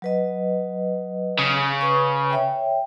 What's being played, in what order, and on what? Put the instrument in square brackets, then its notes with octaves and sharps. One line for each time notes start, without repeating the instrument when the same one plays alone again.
[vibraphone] F#3 B4 D#5
[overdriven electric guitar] C#3
[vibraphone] B4 C#6
C#5 E5 G5